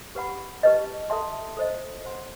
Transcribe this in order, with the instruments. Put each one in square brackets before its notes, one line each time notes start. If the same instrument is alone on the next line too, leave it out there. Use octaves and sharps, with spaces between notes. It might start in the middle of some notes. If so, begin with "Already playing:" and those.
[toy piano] G4 B4 F#5 B5
G4 B4 D#5 A5
A4 E5 A5 C6
A4 C5 D#5
C5 F#5 C6